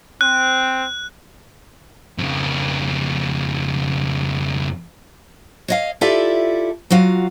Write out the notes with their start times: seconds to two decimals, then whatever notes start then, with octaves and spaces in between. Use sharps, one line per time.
0.21 C4 F#6
2.18 F2 C#3
5.68 C#5 D#5 F5
6.01 E4 F4 G4 A4 D5 E5
6.90 F#3 F4 F#4 F5